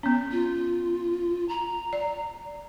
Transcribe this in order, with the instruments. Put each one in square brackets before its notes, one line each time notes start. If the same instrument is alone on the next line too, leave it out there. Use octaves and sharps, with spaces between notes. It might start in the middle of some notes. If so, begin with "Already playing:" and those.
[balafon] B3 C#4
[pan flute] F4
A#5
[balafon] D5